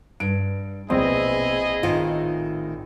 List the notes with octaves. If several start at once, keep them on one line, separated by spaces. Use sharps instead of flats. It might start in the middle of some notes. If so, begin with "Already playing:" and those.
G2 D7
A#1 B2 C4 E4 G#4 D#5
A2 D#3 F4